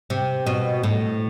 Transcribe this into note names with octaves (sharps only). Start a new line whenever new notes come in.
C3
B2
A2